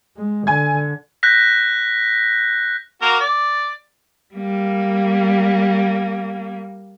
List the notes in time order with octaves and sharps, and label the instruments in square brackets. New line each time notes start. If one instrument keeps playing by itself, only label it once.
[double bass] G#3
[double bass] D3 [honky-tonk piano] G#5 G#6
[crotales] F#6 G6 A#6 B6
[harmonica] A#3 F#4 A#4
D5
[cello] G3 A#3